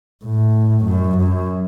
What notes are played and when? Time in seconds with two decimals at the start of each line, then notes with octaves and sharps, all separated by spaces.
0.24 A2
0.86 F#2
1.18 F#2